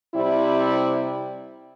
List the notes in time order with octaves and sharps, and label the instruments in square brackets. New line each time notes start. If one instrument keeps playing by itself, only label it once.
[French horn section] C3 G3 C4 E4